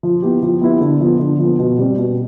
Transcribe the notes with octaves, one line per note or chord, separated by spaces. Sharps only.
F3
B3 E4 G4
F3
B3 E4 G4
D3
F3 B3
D3
F3 B3
B2
G3 C4
B2